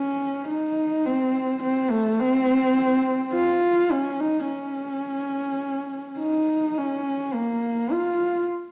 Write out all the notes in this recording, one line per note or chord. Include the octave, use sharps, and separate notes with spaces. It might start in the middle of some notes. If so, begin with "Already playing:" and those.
Already playing: C#4
D#4
C4
C4
A3
C4
F4
C#4
D#4
C#4
D#4
C#4
A#3
F4